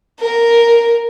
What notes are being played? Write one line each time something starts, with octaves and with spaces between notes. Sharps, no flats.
A#4